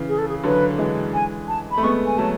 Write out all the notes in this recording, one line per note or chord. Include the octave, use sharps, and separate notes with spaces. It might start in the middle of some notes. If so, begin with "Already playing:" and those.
Already playing: C#3 E3
G#4
A4
G#4
D3 F#3 B4
E3 G#3
G#5
A5
B5
A3
G#3 B3 C#6
G#5
F#3 A3 A5